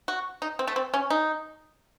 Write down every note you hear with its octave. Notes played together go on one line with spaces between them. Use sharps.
F#4
D#4
C4
A3
C4
C#4
D#4